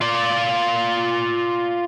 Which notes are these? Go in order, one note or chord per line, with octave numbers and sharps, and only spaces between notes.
F4 D5